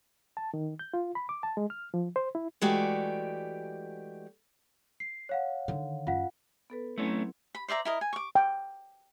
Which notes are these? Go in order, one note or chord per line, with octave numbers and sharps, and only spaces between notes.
A5
D#3
G6
F4
B5
D6
A5
G#3
F6
F3
C5
E4
E3 G#3 A3 F#4 G4 D5
C7
C#5 F5 F#5
D3 D#3
F#2 F4 F5 F#5
B3 A4 B4
F#3 A3 C4 C#4 E4
B5
C5 D5 E5 A#5
E4 A#4 D#5
G#5
C#6 D6
G5